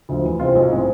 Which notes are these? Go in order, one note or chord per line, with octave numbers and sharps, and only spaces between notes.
D2 D3 F3
E2
C3 G#3 C4 F4
B1
A2 G#3 C4